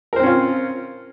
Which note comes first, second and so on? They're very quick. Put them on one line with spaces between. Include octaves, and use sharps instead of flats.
A#4 C5 C4 C#4 F4